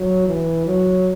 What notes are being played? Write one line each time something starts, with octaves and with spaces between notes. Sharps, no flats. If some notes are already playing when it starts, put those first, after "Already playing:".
Already playing: F#3
E3
F#3